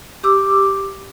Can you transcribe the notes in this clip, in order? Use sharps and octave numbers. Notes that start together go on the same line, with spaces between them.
G4 D6 E6